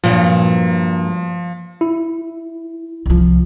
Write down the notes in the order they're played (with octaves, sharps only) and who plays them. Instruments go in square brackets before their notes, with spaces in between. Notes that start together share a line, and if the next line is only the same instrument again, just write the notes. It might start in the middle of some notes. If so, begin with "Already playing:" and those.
[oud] G2 A#2 F#3 [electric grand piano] F3
[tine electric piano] E4
[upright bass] C2 F3